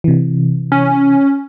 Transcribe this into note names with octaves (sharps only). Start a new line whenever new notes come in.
C3 E3
C#4